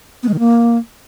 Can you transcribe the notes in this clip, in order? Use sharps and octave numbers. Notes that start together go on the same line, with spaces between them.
B3
G#3
D#3
A#3